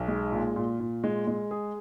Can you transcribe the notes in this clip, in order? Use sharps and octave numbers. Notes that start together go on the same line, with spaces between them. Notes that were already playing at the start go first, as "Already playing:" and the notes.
Already playing: B1
G#3
A#2
A#2
A#2
G#3
G#3
G#4